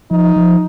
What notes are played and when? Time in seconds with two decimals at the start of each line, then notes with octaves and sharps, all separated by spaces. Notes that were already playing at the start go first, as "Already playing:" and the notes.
0.11 F3 D#4
0.36 F3